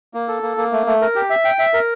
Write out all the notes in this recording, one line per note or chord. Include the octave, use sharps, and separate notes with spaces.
A#3
A4
A#3
A#3
A3
A3
A#4
G4
E5
G5
E5
A#4